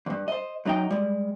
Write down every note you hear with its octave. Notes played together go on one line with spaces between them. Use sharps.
E2 G2
C5 D#5
F#2 F#3 D#4 D#5 G5
G3 G#3